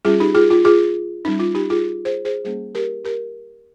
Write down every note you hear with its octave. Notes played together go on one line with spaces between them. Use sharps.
G3 C#4 F4 G#4
D#4 G4
F4 G#4
F4
F4 G#4
G3 C#4 D#4
F4
D#4 G4
F4 G#4
G#4 C5
G#4 C5
G3 A#3 C#4 G#4 C5
G4 A#4
G4 A#4